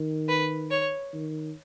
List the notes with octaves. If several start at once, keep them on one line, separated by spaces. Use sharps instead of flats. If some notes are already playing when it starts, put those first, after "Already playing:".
Already playing: D#3
B4
C#5
D#3